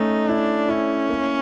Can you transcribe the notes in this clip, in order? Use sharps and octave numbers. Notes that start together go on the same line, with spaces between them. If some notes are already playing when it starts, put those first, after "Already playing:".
Already playing: A3 C#4 D#4
D4 E4
C#4 E4
A#3